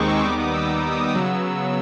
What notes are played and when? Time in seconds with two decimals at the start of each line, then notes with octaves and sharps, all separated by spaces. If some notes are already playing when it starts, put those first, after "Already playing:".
Already playing: D#2 D#3 G#3 C4 D#4 C#6 D6
0.09 E6
0.23 D#2 D#3 G3 B3 D#4 D6
0.40 D#6
0.53 E6
0.69 E6
0.92 D#6
1.06 D#6
1.14 C#3 F#3 B3 E6